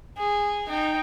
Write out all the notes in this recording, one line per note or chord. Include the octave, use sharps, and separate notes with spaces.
G#4
D#4 G5